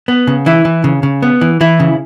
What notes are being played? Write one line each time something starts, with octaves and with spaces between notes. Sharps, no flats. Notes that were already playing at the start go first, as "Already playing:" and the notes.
B3
C#3
E3 E4
E3
C#3
C#3
B3
E3
E3 E4
C#3